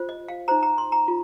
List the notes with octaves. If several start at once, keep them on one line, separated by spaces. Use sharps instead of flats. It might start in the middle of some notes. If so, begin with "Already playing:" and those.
Already playing: F4 C5
D#5
F5
D#4 C5 A#5
A#5
C6
A#5
F4